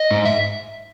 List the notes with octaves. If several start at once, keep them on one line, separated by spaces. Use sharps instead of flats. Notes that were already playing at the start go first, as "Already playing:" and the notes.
Already playing: D#5
G#2
E5